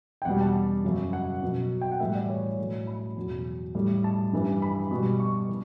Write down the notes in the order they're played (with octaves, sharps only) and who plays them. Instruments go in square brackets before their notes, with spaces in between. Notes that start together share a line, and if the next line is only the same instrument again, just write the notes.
[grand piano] G5
E2 B2 G3 F#5
A5
F#2 C#3 F#3
F#5
B2 F#3
G5
F#5
A2 E3 G3 E5
D5
C#5
A2 F#3
B5
E2 B2 F#3
A2 G3
A5
G2 E3 G3
B5
B2 G3
C#6
E3